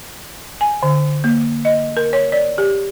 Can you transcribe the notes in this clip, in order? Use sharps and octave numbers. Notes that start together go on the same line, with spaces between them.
G#5
D3
A#3
D#5
A#4
C#5
D5
G4